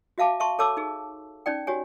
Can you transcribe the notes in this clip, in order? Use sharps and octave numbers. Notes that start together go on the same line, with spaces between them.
F#4 E5 F5 A5 D6
E5 A5 C6 C#6
A4 C#5 A5 D6 E6
D#4 G#4
C#4 D#4 D5 G5
F#4 G4 C#5 G#5